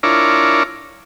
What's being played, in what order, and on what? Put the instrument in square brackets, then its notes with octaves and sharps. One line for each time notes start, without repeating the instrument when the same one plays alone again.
[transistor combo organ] D4 E4 F4 A#4 C#5 D5